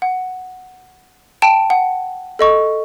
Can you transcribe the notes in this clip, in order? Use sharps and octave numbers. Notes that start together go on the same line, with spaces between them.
F#5
G5 A5 D7
F#5
A4 D#5 C#6